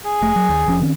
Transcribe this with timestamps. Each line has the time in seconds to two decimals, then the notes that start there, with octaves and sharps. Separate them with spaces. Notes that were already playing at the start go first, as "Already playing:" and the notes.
0.05 G#4
0.21 F1 A3
0.36 F#3
0.49 D#2
0.66 F1 F3 C#4
0.81 D#3 C4 C#4